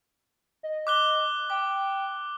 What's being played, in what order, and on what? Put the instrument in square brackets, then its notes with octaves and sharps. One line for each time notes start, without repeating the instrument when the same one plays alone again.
[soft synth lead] D#5
[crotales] D6 F#6 G7
[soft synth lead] G5 [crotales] D6